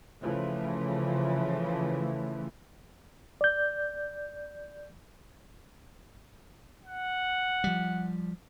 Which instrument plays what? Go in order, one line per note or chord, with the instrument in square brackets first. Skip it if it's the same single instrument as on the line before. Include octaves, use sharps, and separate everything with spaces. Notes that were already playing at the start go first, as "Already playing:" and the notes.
[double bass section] C#3 E3 F3 A3
[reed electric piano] D5 G6
[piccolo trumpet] F#5
[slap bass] F3 G3